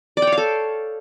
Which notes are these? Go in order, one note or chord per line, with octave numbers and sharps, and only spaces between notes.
D5
G5
C#5
F5
A4